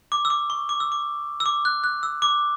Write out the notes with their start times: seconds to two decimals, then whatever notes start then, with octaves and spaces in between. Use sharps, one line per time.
0.12 D6
0.25 E6
0.30 D6
0.50 C#6
0.69 D6
0.80 E6
0.92 D6
1.40 E6
1.46 D6
1.65 F#6
1.84 F#6
2.03 E6
2.22 D6